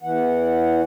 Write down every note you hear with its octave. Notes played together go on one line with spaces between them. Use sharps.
E2 E3 F#5